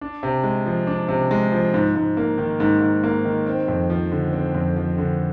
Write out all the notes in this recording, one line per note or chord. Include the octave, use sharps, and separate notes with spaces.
D4
C3
G#3
F3
D4
C3
G#3
F3
G#2
G#2
A#3
D#3
G#2
G#2
A#3
D#3
C4
F2
F3
D3
C4
F2
F3
D3